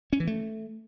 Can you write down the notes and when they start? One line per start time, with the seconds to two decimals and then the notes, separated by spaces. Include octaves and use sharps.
0.13 C#4
0.20 E3
0.27 A3